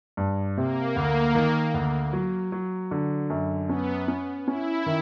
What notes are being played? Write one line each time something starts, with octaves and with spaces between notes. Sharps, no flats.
G2
C3 A#3
D2
D#3
D2
F#3
F#3
D3
F#2
B3 C#4
C#4
C#4 E4
D#3